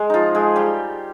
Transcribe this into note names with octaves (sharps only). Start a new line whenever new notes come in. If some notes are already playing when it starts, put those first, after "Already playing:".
Already playing: G#3
F3 D#4 F4
G#3 G#4
G3 G4